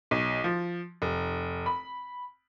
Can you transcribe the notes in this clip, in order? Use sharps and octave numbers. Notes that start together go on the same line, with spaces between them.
B1
F3
F1
B5